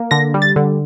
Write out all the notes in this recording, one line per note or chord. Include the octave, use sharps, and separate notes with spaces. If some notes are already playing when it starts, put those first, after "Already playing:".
Already playing: A#3
D3 A#6
G3
A6
D3